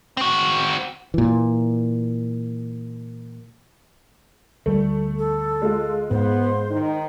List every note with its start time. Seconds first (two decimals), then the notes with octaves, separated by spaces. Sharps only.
0.17 C4 F#4
1.14 A#2 E3
4.66 D2 G3 A3
5.19 A4
5.62 G#3 F4
6.11 G#2 B3 C5
6.71 D#3 D#4